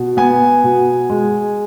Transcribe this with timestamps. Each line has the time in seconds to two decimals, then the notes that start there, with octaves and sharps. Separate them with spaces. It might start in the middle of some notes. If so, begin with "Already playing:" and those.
Already playing: B2
0.17 B3 G#5
0.64 B2
1.10 G#3